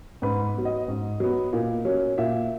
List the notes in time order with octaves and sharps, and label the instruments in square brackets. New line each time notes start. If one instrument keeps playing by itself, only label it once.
[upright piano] G#2 B4
F#3 B3
D#5
G#2
F#3 B3
A#2
F#3 C#4
A#2 E5